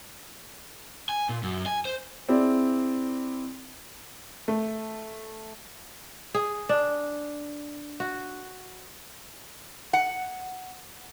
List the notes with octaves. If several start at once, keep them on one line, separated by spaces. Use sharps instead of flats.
G#5
A#2
F#2
G#5
C5
C4 E4 G#4 D5
A3
G#4
D4
F#4
F#5